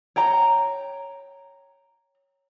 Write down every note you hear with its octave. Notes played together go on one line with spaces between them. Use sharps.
C#5 G5 A#5